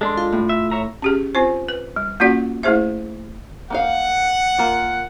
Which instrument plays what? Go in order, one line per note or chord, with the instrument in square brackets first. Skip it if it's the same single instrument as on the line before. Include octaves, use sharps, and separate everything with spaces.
[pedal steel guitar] G#3 D4 [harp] A4 C6
[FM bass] F4
[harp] A2
[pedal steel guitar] E5
C#5 E5 A#5
[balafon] C#4 G4 G#4
C4 F4 C5
B4
G3
A#3 C#4 F4 F#4 D5 F#5
A3 E4 G#4 C5 E5
[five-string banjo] A#3 D#4 F5 [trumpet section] F#5
[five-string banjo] A#3 F4